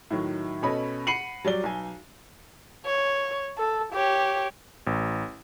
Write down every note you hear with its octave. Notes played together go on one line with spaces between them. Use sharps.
A2 D#3 F#3
B2 C#4 A4 C#5 D#5 B5
F#5 B5 C7 C#7 D#7 F#7
F#3 G3 D5 G7
B1 G#5
C#5
A4
G4 C#5
A1